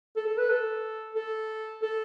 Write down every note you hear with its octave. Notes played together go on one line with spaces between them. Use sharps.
A4
A4
B4
A4
A4
A4